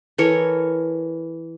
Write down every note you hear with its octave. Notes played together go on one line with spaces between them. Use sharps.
E3 A4 A#4 C#5